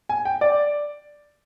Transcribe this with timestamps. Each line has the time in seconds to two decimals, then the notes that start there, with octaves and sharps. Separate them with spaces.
0.09 G#5
0.25 G5
0.41 D5